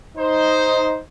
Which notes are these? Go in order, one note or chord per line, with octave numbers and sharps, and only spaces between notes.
D#4 C5